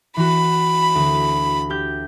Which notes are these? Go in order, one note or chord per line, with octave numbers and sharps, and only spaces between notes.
E3 F#4 B5
D2
G4 G6